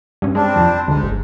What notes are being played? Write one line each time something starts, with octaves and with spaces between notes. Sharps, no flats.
G2 C#4
G3 G#3 C4 D4
F2 F3
D2 G#2 G#3
G1